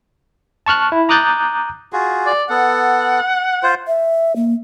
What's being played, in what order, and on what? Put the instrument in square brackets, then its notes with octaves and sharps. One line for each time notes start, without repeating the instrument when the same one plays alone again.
[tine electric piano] A5 C#6 F6 F#6
E4
A#5 D6 D#6 F#6 G6 A6
[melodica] F4 F#4 G#4
[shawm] D5
[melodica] B3 A4 [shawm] F#5
[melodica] F4 C5
[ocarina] E5
A#3